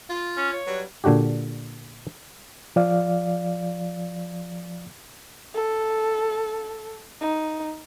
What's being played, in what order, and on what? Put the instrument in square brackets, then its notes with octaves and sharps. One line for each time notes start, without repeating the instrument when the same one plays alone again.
[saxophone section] F4
[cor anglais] C#4
C#5
[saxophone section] F#3 G3 B4
[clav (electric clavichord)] A#2 D3 D4 F#4 G4
[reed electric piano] F3 D5 F5
[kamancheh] A4
D#4